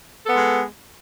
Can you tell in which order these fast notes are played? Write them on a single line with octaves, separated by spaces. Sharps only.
A4 B3 G#3